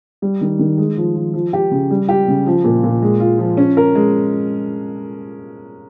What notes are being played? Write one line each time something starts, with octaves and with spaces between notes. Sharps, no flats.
G3
D#3
D#3
G#3
F3
F3
F3
G4
C#3
G3
G4
C#3
F3
A#2
A#2
G#3
F4
F3
C#4
A#4
G#3